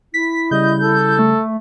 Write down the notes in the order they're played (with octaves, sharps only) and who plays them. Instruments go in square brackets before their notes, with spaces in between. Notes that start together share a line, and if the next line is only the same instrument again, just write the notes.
[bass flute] E4 [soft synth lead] B6
[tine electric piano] C#3 G3 [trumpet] D#5 [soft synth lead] G6
[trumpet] A4
[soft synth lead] A3